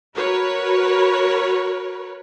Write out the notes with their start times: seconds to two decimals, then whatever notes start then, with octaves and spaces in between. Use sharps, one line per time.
0.15 F#4 A#4 B4 C#5